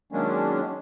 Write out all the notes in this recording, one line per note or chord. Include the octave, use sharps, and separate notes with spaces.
D#3 F#3 G#3 A#3 C#4 D4